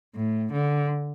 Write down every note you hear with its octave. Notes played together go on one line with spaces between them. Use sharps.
A2
D3